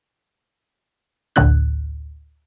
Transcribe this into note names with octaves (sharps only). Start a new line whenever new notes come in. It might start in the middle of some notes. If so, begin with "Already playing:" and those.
A1 D2 A2 D3 F#6